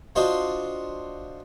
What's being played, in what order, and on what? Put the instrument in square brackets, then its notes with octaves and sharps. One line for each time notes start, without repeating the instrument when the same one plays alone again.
[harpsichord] D4 F4 F#4 C5 D#5